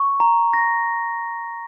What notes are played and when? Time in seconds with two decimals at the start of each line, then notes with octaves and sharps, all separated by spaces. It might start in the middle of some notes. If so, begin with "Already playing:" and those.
Already playing: C#6
0.20 A#5
0.53 A#6